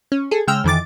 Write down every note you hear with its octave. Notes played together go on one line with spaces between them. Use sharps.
C#4
G#4 A4
C#3 G#3 G5 E6 F6
F2 D#3 E3 D6 A6